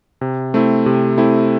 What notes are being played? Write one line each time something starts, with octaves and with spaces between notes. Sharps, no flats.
C3
A3 C4 E4
C3
A3 C4 E4